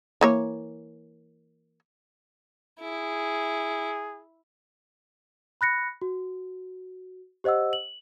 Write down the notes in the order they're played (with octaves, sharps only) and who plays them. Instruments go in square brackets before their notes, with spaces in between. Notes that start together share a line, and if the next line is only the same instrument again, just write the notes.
[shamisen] E3 A#3 C#5
[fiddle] E4 [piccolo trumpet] G#4
[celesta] B5 F#6 A#6 C#7
F#4
G4 C5 D#5 F#5 E6
F#7